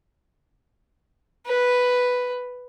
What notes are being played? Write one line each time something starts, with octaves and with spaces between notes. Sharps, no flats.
B4